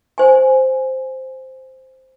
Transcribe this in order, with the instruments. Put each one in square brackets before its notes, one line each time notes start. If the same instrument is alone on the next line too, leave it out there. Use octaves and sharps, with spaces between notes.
[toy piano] C5 G#5